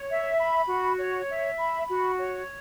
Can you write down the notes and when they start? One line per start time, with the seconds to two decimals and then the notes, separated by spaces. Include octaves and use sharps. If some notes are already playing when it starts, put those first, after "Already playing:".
Already playing: C#5
0.09 E5
0.40 B5
0.68 F#4
0.98 C#5
1.29 E5
1.58 B5
1.88 F#4
2.18 C#5